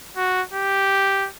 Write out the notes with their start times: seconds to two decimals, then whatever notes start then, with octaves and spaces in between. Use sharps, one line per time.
0.17 F#4
0.54 G4